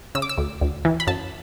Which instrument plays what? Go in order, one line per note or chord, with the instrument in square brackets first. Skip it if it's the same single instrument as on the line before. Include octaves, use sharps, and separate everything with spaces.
[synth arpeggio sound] C#3 E6
D6
E6
D2
D2
E3
B5
F#2 A5